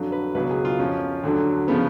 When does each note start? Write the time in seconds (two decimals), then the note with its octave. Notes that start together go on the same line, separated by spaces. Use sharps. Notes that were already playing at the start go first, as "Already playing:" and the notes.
Already playing: F2 D3 F#3
0.12 B4
0.35 C#2 B2 F#3 B4
0.50 G#4
0.65 F4
0.79 F2 F3 C#4
1.23 D2 D3 F#3
1.68 C#3 F3 B3